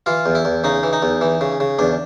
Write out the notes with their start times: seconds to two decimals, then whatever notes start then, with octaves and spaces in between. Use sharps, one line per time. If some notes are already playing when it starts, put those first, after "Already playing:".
0.06 E3 F4
0.26 E2
0.35 E4
0.45 E2
0.64 C#3 D#4
0.83 E3
0.93 D#4
1.02 E2
1.21 E3
1.41 C#3
1.60 C#3
1.79 E2 D4